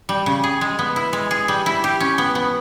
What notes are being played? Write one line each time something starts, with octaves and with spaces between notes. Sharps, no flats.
G3
C#3
G#4
G#3
B3
E4
G#3
G#4
G3
E4
G4
C#4
B3
B3